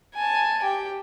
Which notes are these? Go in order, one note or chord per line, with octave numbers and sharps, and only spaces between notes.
G#5 A5
G4 G5